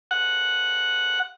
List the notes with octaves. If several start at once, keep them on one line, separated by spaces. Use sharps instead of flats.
F#5